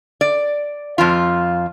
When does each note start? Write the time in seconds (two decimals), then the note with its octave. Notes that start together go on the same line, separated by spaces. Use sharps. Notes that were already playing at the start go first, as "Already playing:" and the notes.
0.21 D5
0.98 F2 F3 F4